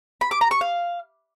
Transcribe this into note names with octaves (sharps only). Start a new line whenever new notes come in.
B5
D6
A#5
C#6
F5